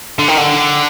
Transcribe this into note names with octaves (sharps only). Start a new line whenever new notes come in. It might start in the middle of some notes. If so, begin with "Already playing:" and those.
D3
D#3
D3